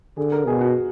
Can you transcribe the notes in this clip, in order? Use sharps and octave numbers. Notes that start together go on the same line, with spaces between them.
D3 G#4
A#4
B2 G#4
F#4